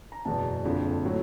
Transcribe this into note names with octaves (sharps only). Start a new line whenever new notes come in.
A#5
F#1 E2 B2 A5
F#1 F2 D3 F3
A2 F#3